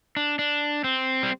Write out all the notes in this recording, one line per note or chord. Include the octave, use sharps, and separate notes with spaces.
D4
D4
C4
G3